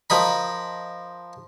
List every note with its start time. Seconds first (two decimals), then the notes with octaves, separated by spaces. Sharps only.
0.10 F3 A#4 D#5 B5